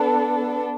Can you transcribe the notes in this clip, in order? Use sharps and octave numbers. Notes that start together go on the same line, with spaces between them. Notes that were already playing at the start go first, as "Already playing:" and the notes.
Already playing: B3 D4 A4